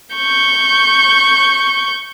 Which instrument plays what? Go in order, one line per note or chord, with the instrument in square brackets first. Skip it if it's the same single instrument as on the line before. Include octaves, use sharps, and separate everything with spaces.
[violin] C#6 G6